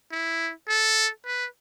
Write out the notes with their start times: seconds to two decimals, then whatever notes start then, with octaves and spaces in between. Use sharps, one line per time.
0.12 E4
0.69 A4
1.26 B4